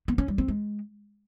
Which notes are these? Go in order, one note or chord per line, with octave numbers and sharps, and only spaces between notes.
B3
C#4
G3
C4
G#3